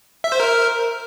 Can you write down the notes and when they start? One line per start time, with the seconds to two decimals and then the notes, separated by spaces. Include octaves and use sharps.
0.24 E5
0.32 C5
0.40 A#4